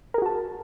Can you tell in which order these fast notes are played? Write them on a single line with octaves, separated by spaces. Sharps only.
A#4 G#4 F#4 A5